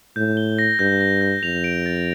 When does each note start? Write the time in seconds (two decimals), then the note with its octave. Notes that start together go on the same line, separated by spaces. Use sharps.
0.16 A2 G6
0.37 G7
0.59 A#6
0.79 G2 G6
1.01 A#6
1.21 G6
1.43 F2 F7
1.64 D7
1.86 A6